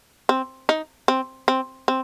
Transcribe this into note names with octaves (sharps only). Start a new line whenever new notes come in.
C4
D#4
C4
C4
C4